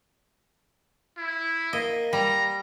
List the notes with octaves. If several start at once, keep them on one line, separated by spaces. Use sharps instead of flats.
E4
A#3 D#5
G3 A#5